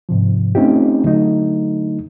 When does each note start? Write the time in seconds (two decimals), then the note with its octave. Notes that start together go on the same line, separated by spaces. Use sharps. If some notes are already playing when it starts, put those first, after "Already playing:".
0.09 G#2 C3 F3
0.55 A3 C4 C#4 D#4 F4 G4
1.04 D3 F#3 A3 D#4